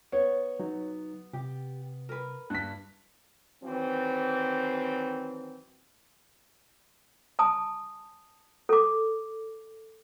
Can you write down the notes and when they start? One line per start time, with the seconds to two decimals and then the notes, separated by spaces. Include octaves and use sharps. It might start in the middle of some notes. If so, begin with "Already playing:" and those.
0.12 B3 C#5
0.60 F#3 D#4
1.33 C3 G4
2.09 A#4 B4
2.50 G2 E4 F#6 B6
3.64 D#3 E3 F#3 C4
7.39 G#5 A5 D#6
8.69 A4 D6